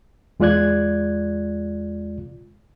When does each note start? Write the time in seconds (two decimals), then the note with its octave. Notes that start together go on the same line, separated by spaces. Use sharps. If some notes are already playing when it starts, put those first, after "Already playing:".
0.40 E2 G#3 F4 D5 F#6 G#6